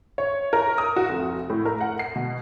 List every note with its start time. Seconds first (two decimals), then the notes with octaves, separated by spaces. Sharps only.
0.18 C#5
0.53 A#4
0.78 D#6
0.96 F#4
1.09 F1
1.50 A2
1.65 A#4
1.81 F#5
1.99 C7
2.16 B2